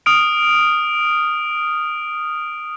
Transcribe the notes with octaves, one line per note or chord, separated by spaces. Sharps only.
D#6 F6 D7